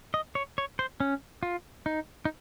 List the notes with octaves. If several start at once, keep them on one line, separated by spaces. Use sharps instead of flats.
D#5
C#5
C#5
C5
C#4
F4
D#4
D#4